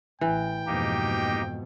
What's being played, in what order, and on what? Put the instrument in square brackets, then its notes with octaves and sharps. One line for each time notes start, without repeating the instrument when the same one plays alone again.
[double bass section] A1 [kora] E3 [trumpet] G5
[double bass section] F2 G#2 B2 [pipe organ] A#3 D#4 G4